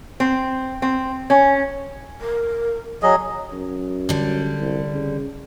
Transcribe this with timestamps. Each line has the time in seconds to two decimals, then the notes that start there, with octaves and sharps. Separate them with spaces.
0.20 C4
0.82 C4
1.30 C#4
2.21 A#4
3.03 F#3 G#4 D#5
3.52 F#2
4.09 D3 G3
4.59 C2
4.92 C#3